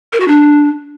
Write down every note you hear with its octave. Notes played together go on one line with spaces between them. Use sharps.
A#4
F#4
D4